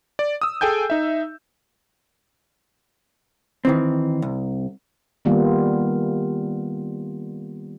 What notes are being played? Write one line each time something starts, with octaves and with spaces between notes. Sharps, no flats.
D5
D#6 E6
G#4 A4 G5 G#5 G6
D#4 E5
D#3 E3 C4
C2
D#3 G3 A#3 B3 F4